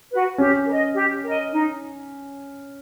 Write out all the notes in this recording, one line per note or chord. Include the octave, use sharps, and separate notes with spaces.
F#4 B4
C#4 G4
A#4
D#5
G4
A#4 D#5
D#4